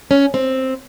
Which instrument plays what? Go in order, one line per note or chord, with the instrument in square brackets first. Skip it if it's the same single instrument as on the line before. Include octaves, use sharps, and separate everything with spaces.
[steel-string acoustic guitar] C#4
C4